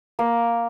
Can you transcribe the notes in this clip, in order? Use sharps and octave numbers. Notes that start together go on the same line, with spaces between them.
A#3